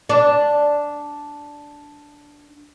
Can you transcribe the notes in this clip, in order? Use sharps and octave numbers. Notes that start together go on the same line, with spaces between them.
D4 D5